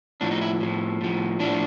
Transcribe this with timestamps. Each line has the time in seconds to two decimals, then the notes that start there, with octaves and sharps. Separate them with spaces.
0.21 A2 F3 D4
0.31 D#4
0.41 E4
0.61 A2 F3
1.01 A2 F3
1.40 A2 F3 D4